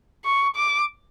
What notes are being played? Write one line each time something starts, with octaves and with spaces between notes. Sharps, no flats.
C#6
D6